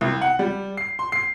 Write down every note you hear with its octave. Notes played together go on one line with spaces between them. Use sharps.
C2
F#5
G3
C7
C6
C7